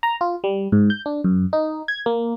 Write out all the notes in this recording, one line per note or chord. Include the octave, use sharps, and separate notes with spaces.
A#5
F4
G3
G#2
G6
D4
F#2
D#4
G#6
A#3